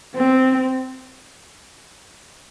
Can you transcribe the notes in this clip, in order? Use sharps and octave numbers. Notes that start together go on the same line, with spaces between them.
C4